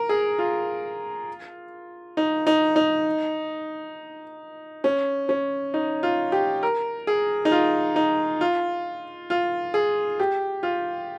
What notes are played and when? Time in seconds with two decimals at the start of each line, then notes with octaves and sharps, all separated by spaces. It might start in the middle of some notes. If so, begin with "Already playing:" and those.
Already playing: A#4
0.09 G#4
0.39 F4
2.17 D#4
2.47 D#4
2.76 D#4
4.84 C#4
5.29 C#4
5.74 D#4
6.03 F4
6.32 G4
6.63 A#4
7.07 G#4
7.45 D#4
7.52 F4
7.96 D#4
8.41 F4
9.30 F4
9.74 G#4
10.20 G4
10.63 F4